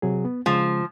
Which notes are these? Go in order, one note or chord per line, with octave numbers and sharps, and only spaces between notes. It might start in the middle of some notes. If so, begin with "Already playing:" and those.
C3 F#3 G#4
B3
C#3 F3 G#3